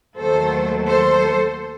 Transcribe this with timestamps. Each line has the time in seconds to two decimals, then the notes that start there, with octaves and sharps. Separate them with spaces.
0.16 D#2 D#3 F#3 A3 A4 C5
0.85 A4 C5